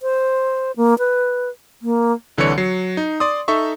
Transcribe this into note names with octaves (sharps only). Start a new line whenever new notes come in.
C5
A#3
B4
A#3
C2 D3 E3 D4 C#5 C#7
F#3 C7
D#4
D5 C6 D#6
D#4 A4 E5 C#6